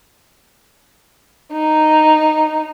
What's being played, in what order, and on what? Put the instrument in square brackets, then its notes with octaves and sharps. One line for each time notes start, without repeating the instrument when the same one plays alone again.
[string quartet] D#4